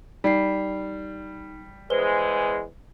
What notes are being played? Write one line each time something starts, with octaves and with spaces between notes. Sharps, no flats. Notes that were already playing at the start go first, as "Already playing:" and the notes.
G3 D#4 C7
E2 G#3 B4 C5 G7